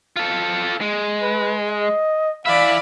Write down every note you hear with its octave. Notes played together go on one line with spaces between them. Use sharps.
F4 A4
G#3
B4
D#5
E3 D5 E5 F5 B5